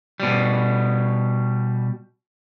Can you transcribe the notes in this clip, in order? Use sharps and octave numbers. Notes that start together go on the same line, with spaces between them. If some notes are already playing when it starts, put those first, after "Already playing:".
B2 G3